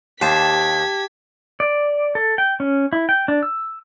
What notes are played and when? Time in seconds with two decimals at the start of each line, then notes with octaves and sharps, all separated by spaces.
0.22 D#2 G4 C5 A5 G#6 B6
1.60 D5
2.15 A4
2.38 G5
2.60 C#4
2.93 E4
3.09 G5
3.28 D4
3.43 E6